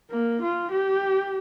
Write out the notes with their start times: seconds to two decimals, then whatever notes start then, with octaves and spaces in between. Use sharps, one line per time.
0.11 A#3
0.42 F4
0.72 G4